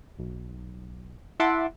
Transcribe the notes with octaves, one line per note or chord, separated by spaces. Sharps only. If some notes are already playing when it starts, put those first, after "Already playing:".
B1
E4 E5 F#5 A5 C6 D6